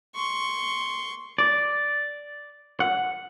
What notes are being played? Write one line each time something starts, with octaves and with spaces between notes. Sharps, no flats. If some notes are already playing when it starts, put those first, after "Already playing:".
C6 C#6
D5
F#5